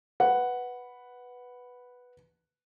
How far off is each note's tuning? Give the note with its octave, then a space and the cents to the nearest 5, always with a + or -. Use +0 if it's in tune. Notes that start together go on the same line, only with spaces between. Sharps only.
B4 +0 F#5 +0